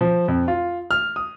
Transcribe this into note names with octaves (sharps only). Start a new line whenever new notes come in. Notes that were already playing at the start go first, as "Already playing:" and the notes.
F3
F2
F4
F6
D#6